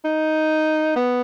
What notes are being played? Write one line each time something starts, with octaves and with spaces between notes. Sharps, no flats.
D#4
B3